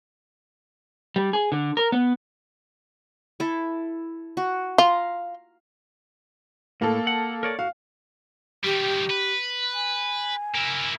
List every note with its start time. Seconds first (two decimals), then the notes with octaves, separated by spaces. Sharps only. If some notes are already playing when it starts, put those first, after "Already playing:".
1.16 G3
1.33 G#4
1.52 D3
1.77 A#4
1.92 B3
3.40 E4 A4
4.37 F#4
4.78 F4 F5 A#5
6.82 A2 A#3 A4
7.07 F#5
7.43 A#4 C#5 D5
7.59 F#4 F5
8.64 D#3 G3 G4
9.10 B4
9.74 G#5
10.55 A#3 E4